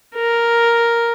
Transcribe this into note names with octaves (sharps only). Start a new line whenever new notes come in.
A#4